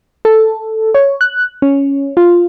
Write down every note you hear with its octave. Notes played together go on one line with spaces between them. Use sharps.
A4
C#5
F#6
C#4
F4